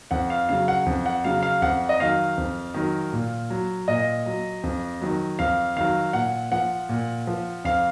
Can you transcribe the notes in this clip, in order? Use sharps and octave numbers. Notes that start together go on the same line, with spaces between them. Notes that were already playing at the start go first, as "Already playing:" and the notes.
F2 F#5
F5
C#3 F#3 F5
F#5
F2
F#5
C#3 F#3 F5
F5
F2 F#5
D#5
D#3 F#3 F5
F2
D#3 F#3
A#2
F#3
A#2 D#5
F#3
F2
D#3 F#3
F2 F5
D#3 F#3 F5
A#2 F#5
F3 F#5
A#2
F3
F2 F5